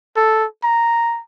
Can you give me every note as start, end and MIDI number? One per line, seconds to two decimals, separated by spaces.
0.16 0.45 69
0.64 1.20 82